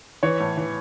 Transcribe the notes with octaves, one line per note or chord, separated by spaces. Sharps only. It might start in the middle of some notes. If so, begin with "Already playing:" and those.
E3 C#5
A2
E3